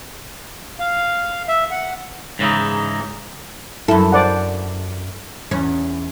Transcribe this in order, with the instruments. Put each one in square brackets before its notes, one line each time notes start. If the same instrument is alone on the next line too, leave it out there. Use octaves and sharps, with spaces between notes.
[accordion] F5
E5
F#5
[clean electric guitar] G#2 C#3 E3 D#4
[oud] F#2 A4 [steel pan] E4
[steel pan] C5 D5 F#5
[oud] E2 C#4